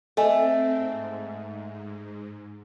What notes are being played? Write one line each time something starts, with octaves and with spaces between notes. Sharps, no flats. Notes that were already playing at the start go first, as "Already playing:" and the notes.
A3 C4 A4 D#5 G#5
G#2